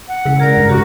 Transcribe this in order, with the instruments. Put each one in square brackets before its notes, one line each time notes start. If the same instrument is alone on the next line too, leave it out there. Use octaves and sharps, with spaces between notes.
[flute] F#5
[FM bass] C#3 [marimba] G#3 E4
[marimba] G#4 D5 [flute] A#4
[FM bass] G2
[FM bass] C#3 [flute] F#4 [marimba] G4 D6